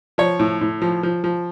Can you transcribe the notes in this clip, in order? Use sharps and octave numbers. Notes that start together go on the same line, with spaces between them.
F3 C#5
A2
A2
F3
F3
F3